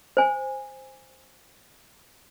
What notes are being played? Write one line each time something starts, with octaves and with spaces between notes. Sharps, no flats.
C5 G#5